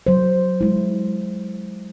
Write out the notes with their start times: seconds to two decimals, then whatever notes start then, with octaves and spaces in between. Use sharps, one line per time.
0.07 F#3 C5
0.61 G#3 E4